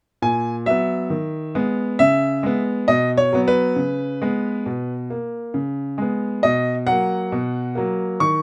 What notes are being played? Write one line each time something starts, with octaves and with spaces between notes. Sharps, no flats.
A#2 G#5
F#3 B3 E5
D#3
G#3 B3
C#3 E5
G#3 B3
B2 D#5
C#5
F#3 B3
B4
C#3
G#3 B3
B2
A#3
C#3
G#3 B3
B2 D#5
F#3 A#3 F#5
B2
F#3 A#3
D#3 C#6